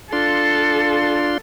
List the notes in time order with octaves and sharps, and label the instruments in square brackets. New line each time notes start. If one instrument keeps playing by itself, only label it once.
[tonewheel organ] D4 F4 C6 [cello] A4